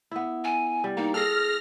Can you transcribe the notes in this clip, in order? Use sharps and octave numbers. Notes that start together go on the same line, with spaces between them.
B3 E4
G#5
G3
A#3 D#4
G#4 A4 F6 A#6